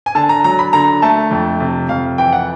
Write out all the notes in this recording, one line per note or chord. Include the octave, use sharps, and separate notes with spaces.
G#5
D3 A5
A#5
F#3 A#5
B5
D3 A#5
A3 A5
F2
C3
F2 F5
E3 G5
F#5